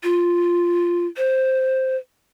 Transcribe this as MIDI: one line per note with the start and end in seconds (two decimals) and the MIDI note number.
0.04 1.07 65
1.17 1.96 72